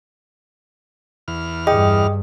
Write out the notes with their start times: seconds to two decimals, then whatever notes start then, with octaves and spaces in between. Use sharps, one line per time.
1.28 E2 F6
1.67 G2 G#4 D#5 G5 D#6